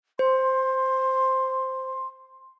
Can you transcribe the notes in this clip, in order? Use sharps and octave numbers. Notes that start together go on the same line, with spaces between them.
C5 C6